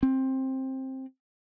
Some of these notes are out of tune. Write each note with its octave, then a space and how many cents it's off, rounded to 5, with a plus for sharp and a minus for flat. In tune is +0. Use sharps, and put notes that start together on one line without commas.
C4 +15